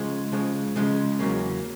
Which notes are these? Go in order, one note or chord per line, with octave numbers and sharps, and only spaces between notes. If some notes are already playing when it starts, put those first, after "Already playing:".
Already playing: C#3 F3 G#3
C#3 F3 G#3
C#3 F3 G#3
E2 C#3 F#3 A#3 C#4